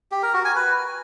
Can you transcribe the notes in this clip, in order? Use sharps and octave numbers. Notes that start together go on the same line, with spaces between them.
G4
A#4
F#4
G#5
B4